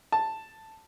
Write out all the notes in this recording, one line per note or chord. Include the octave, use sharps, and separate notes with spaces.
A5